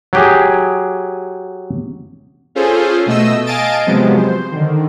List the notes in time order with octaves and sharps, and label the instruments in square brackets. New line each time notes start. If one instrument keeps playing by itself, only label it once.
[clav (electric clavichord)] F#3 G4 G#4
[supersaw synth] C#4 F4 G#4 A4 C5
B2 A3 D#5 E6
D#5 F5 G#5 A5 A6 D7
C3 F3 F#3 G#3 B3
C5
D3 D#3